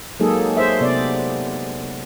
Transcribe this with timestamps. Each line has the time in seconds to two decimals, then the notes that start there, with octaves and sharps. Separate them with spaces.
0.20 F#3 G#3 A#3 D#4 G#4 A4
0.57 G#4 C5 E5
0.81 C3 B3 D5